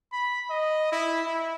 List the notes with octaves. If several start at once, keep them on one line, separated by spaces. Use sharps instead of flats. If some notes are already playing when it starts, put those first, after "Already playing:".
B5
D#5
E4
E4